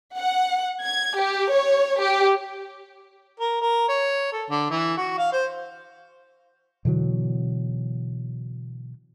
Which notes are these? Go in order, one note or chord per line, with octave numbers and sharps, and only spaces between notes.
F#5
G#6
G4
C#5
G4
A#4
A#4
C#5
A4
D3
E3
F#4
F5
C5
B2 D3 E3 F#3